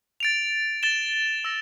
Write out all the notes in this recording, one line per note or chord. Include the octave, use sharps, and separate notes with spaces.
A6 D7 F7
A6 E7 G7
E6 A#6